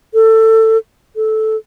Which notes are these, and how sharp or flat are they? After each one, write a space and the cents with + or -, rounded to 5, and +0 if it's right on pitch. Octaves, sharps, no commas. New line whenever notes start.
A4 +20
A4 -10